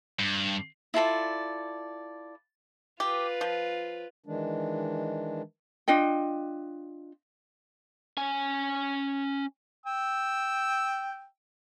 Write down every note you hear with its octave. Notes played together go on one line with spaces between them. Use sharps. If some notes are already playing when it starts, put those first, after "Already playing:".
G2
E4 F4 A4 D5
F4 G4 B4
F3
D#3 E3 G#3 D4
D4 F4 D#5 G5
C#4 G#5
G5 E6